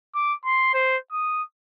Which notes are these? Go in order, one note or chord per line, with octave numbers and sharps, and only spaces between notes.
D6
C6
C5
D#6